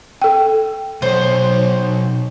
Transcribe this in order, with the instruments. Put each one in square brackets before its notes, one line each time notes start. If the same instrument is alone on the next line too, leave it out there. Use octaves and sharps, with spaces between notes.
[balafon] A4 G5
[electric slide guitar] B2 F#3 C#5 [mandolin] C5